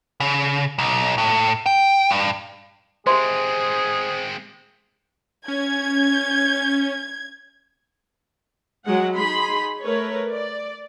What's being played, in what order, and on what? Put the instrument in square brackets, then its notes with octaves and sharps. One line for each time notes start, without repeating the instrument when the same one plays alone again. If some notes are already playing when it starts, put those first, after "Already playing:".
[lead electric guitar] C#3
B1
A2
G5
G2
[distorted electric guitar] G#3 C4 [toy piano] G4 E5 C6 [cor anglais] G#4 [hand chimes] C5
[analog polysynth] C#4 [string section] G#6
[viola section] F#3 G#3 F#5
D#4 G#4 B5 C6
A3 A#4 B4 C#5
D5